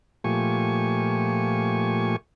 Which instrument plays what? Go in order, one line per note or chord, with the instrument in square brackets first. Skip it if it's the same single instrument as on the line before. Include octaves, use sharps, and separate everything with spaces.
[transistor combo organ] A#2 F3 A3 G4 G#5 C#6